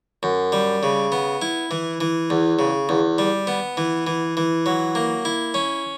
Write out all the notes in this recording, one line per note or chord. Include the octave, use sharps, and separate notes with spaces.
F#2
G3
C#3
B3
E4
E3
E3
E2
C#3
E2
G3
B3
E3
E3
E3
F#3
A#3
E4
C#4